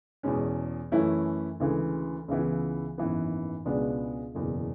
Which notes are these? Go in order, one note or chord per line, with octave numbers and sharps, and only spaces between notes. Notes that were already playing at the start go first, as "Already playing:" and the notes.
E2 B2 G#3 C#4
F#2 E3 A3 C#4 E4
D2 C#3 E3 G#3
C#2 C#3 E3 B3 E4
G#1 F#2 E3 B3
C#2 B2 G#3 B3 D4
F#1 E2 B2